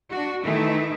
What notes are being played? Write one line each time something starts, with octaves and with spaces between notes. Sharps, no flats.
D4 F#4
D#3 E3 A3 D#4 E4